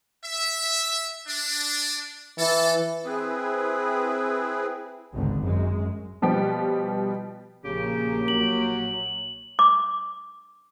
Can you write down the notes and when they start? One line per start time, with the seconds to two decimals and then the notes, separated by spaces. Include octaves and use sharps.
0.24 E5
1.28 D4
2.39 E3 A4
3.05 C4 E4 G#4 B4
5.13 G#1 C#2 D3
5.42 F#2 G#3
6.22 B2 F3 G3 B3 G4
7.65 A#1 C#3 A#3 G4
8.28 F#3 F#7
9.59 D6